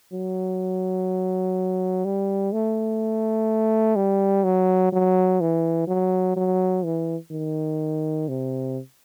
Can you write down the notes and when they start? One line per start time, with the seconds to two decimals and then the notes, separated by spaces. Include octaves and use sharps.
0.13 F#3
2.05 G3
2.52 A3
3.96 G3
4.44 F#3
4.92 F#3
5.41 E3
5.88 F#3
6.36 F#3
6.85 E3
7.31 D#3
8.29 C3